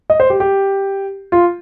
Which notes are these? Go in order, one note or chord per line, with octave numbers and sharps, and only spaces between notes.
D#5
C5
G4
G4
F4